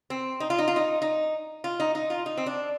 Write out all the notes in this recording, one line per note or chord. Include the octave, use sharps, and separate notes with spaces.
C4
D#4
F4
D#4
F4
D#4
D#4
F4
D#4
D#4
F4
D#4
C4
D4